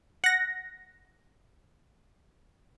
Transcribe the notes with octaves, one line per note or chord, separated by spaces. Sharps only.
F#5 A#6